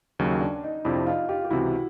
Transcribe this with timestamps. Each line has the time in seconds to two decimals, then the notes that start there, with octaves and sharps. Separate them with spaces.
0.19 D#2 C#3 F#3 D#4
0.41 D4
0.64 D#4
0.85 F2 C3 F3 D4 E4
1.07 D#4 F4
1.29 F4 G4
1.45 G4
1.50 C#2 C3 E3 E4 F#4